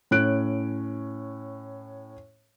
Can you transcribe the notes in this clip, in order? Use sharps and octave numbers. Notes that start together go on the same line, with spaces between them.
A2 C#4 F#6 D7